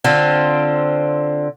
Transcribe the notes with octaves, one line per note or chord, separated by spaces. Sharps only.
D3 C4 F4